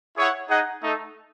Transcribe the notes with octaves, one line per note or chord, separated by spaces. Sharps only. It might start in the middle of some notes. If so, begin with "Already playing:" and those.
E4 G#4 C#5 F#5
D#4 G#4 D#5 F#5
A3 D#4 A4